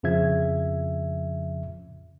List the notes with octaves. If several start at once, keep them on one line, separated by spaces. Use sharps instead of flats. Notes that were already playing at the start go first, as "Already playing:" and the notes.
F2 C#3 F3 E5 G#6